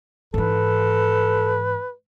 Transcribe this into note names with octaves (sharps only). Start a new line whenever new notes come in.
G#2 E3 A4 B4